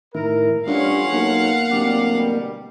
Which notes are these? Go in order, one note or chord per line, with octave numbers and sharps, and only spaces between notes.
A2 D#3 E4 A#4
G2 G3 A3 C#4 F4 F5 F#5
B1 A#3
D1 G4 D5
B2 G3